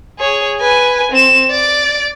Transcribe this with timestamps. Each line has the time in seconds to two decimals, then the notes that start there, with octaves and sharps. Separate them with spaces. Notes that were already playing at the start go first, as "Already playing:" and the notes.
0.19 G#4 C#5
0.60 B4 G#5
1.12 C4 E7
1.50 D5 D7